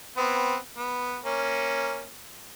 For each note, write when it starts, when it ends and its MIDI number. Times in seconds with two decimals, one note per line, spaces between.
0.17 0.56 59
0.17 0.56 60
0.78 1.18 59
1.24 2.05 58
1.24 2.05 61